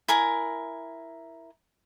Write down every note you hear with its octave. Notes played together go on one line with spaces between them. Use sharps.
E4 A#4 G#5 A#5